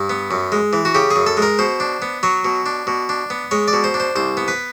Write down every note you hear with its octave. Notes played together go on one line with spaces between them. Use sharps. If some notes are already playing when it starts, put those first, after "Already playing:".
Already playing: G2
B3
F#2
G#3
E3
F#4
C#3 G4
G#4
F#2
A4
G#3
A#4
B2 C5
D4
B3
F#3 C#5
B2
D4
B2
D4
B3
G#3 C#5
D5
B2
C5
D4
C5
C2 C5
B3
B4